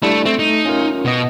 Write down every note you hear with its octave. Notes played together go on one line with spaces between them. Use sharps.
G3 A3 D4 E4
A3 C4
D#4
C#4 F4 A#4
B2 B3 D#5